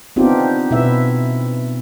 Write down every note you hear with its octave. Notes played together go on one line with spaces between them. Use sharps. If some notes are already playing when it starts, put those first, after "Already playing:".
B3 C4 D4 D#4 F4 G4
B2 E4 B4 E5